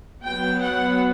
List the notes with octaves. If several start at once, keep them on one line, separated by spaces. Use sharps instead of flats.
F#3 B3 G5
F#5